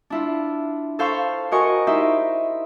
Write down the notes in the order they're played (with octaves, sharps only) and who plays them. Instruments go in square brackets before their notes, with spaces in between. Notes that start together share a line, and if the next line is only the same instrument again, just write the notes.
[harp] D4 E4 F4
A4 C5 F5 B5 C#6
F#4 A#4 C5 D#5 G#5 C#6
D#4 E4 G4 C5 E5